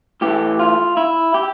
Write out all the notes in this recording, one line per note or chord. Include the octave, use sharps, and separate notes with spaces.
A2 E3 A3 G4
F4
E4
G4